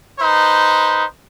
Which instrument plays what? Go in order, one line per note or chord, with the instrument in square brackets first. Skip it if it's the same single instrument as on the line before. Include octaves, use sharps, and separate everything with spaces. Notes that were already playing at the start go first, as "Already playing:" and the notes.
[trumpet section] D#4 B4 C5